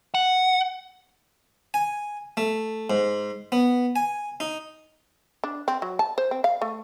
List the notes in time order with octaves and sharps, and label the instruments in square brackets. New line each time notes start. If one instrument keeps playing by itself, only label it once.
[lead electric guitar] F#5
[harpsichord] G#5
A3
G#2
B3
G#5
D#4
[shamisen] D4
C4
F#3
A5
C5
C4
F5
A3